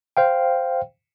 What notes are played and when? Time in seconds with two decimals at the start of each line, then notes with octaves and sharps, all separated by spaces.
0.17 C5 F5 G5